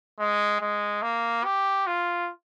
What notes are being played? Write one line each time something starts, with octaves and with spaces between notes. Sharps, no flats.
G#3
G#3
A#3
G4
F4